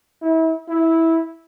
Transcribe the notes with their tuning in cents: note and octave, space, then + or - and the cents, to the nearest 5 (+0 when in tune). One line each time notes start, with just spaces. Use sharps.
E4 -35
E4 -15